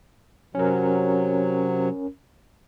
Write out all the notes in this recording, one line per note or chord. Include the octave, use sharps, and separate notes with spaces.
C3 F#3 C#4 A#4